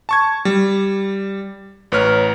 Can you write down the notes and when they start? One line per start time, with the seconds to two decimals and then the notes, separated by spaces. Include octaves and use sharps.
0.09 A5 C#6 G#6
0.45 G3
1.92 A1 B4 C#5 F6